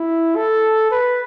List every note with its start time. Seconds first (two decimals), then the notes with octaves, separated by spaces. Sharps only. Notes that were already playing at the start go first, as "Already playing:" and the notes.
Already playing: E4
0.36 A4
0.91 B4